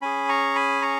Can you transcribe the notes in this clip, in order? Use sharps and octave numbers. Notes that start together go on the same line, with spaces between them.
C#4 G#4 G#5 B5
A#5 C#6
G#5 B5
A#5 C#6